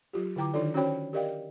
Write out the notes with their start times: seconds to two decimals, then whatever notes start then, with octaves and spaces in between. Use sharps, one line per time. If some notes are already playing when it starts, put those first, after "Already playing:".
0.13 F#3 F4 G4
0.36 D3 E4 G5 A#5 D6
0.53 D#3 D4 D#4 F4 A4 D5
0.74 C#4 F#4 C5 C#5 G5 B5
1.13 G4 A#4 D5 D#5 F5 G5